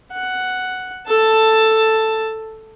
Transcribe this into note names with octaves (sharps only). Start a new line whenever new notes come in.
F#5
A4 A5